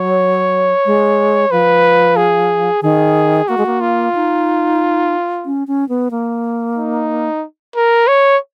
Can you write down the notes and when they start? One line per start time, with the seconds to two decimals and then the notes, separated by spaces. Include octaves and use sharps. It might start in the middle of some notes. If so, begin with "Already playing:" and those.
Already playing: F#3 C#5
0.86 G#3
1.51 F3 B4
2.17 G#4
2.83 D#3 G#4
3.48 A#3 F#4
3.58 G#3
3.66 A#3
3.81 F4
4.15 D#4
5.46 C#4
5.68 C#4
5.89 B3
6.11 A#3
6.76 D#4
7.76 A#4
8.08 C#5